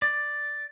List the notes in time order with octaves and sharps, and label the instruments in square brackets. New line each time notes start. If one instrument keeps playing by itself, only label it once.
[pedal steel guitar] D5